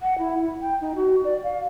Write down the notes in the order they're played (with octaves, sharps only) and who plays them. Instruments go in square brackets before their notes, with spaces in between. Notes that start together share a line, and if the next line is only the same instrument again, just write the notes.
[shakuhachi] F#5
E4
E4
G5
D#4
F#4
D5
F5